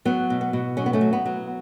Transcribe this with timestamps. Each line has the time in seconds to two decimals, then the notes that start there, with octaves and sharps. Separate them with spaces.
0.05 F#3 B3
0.30 B2
0.41 B3
0.53 B2
0.77 F#3 C#4
0.86 B3
0.93 A3 C#4
1.01 F#3
1.13 B3
1.26 F#3